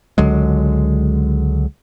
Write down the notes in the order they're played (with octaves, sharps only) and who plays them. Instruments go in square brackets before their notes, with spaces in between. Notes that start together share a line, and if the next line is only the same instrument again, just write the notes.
[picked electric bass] C#2 D3 F#3 G#3